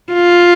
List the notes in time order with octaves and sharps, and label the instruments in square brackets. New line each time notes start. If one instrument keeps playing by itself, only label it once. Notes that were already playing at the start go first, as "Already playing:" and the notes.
[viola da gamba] F4